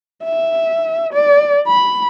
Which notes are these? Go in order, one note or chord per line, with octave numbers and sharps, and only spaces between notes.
E5
D5
B5